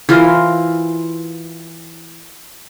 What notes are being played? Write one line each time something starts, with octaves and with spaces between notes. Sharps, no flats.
E3 F4 A#4 C5